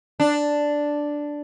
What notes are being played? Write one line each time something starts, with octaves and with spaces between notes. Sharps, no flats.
D4